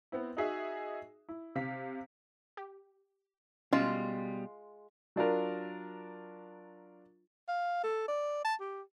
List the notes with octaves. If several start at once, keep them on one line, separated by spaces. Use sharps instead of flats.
B3 C4 E4
D#4 F#4 G#4 E5
E4
C3 F5 B6
G4
B2 G3 G#3 C#4 F4
F#3 D4 F4 A#4
F5
A4
D5
A5
G4